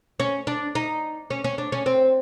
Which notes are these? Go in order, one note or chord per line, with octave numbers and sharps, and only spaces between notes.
C#4
D4
D#4
C#4
C#4
D4
C#4
C4